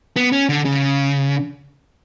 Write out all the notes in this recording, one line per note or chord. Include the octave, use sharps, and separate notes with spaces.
B3
C#4
D3
C#3